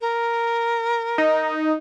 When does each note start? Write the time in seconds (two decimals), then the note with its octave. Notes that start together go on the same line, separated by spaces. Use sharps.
0.01 A#4
1.18 D#4